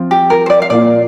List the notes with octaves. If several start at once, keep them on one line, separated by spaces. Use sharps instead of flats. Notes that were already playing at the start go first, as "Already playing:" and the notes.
Already playing: F3 C4 F4
G4
A#4
C5
D5
F5
A#2 A#3 F4 D5